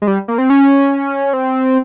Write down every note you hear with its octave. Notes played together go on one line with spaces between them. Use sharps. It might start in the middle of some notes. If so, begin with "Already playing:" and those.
G#3
G3
A#3
C4
C#4
C4